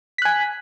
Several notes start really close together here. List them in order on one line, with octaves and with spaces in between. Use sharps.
B6 F#6 G#5